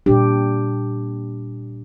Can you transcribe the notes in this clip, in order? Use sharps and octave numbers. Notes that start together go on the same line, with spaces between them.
A#2 G3 D4 G4